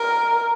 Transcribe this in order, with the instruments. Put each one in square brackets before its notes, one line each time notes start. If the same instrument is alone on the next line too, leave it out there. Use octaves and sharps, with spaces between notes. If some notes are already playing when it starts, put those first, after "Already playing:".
Already playing: [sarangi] A#4